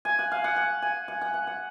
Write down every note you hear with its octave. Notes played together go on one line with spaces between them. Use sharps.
G#5
F#5
F5
F#5
F#5
G#5
F#5
F#5
F#5
F#5